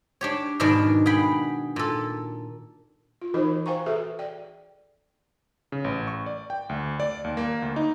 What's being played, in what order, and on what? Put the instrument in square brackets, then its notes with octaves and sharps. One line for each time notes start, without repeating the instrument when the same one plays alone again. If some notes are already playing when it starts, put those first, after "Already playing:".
[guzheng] D4 G4 C#5
G#2 B2 D#3 D4
G#4 F#5 G5 B5
A#2 A4
[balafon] F4
E3 D#4 F#4 A#4 C5 D#5
C5 F5 G5 G#5 A#5 C#6
F#4 G#4 A4 B4 E5
D5 G5
[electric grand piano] C#3
A1
C#6
D5
G5
D2
D5
D#2
A#3
D2
D#4